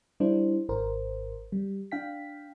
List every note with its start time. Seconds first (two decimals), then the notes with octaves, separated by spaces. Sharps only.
0.20 G3 D4 E4 C5
0.69 G#1 A#4 C5
1.52 G3
1.91 D4 F5 G5 B6